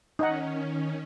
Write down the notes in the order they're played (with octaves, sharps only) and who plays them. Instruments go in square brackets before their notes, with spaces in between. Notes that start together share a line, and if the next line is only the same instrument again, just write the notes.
[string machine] D#3 C#4 [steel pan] D#4 D#5 F#5